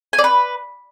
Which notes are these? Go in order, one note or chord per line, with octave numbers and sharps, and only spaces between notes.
G#5
D5
B4